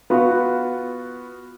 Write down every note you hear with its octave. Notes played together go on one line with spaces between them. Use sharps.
B3 F4 F#4